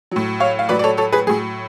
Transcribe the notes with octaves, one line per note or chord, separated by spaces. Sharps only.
A2 F#3
C#5 F5
F5
A2 F#3 B4 D5
D5
A4 C#5
A4 C#5
G#4 B4
A2 F#3 G#4